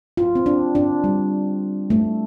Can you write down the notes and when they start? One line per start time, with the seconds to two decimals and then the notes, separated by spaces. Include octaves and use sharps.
0.17 F4
0.35 C4
0.46 D4
0.75 D4
1.04 G3
1.90 A3